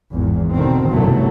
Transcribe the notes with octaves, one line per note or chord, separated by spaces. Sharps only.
G#1 E2
B2 D3 D#3 C4
F#1 C2 G2 B2 F#3 A3